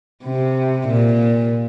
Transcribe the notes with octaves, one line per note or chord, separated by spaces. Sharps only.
C3
A#2